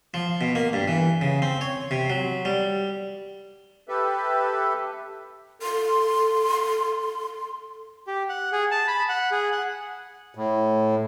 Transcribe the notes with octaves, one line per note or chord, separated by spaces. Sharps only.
F3
B2
A#3
G2
E3
C#3
C4
C#5
C3
F#3
G3
G4 A4 B4 E5
A4 C6
G4
F#5
G#4
A5
B5
F#5
G#4
F#5
A2